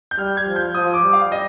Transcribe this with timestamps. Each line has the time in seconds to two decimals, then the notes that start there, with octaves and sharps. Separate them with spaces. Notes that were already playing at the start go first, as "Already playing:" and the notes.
0.11 G6
0.18 G3 F6
0.37 G#6
0.47 F3
0.56 G6
0.75 F3 D#6
0.94 D6
1.03 G3
1.13 F5
1.32 D#5